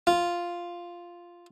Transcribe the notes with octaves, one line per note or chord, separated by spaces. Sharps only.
F4